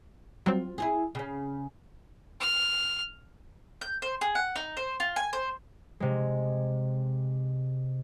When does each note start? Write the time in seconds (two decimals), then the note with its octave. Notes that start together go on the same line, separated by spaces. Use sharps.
0.46 F#3 G3 C4 F4
0.78 E4 F4 G#4
1.15 C#3 C#4
2.41 F6
3.81 G6
4.02 C5
4.21 G#4
4.35 F#5
4.56 D#4
4.77 C5
5.00 F4
5.16 G#5
5.33 C5
6.00 C3 G#3